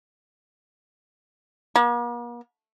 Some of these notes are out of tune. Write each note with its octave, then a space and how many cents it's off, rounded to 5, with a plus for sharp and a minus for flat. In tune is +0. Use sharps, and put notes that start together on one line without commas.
A#3 +45